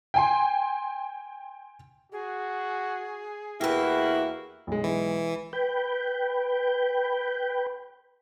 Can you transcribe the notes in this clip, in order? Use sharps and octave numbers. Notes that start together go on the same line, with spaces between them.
G5 G#5 C6
F#4 G#4
E2 A#3 E4 F#4 G4 B4
B1 G#3
E3
B4 G5